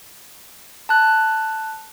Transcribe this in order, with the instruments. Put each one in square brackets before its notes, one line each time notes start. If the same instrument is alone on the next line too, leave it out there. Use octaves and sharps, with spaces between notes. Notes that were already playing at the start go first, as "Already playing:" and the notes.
[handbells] A5 F#6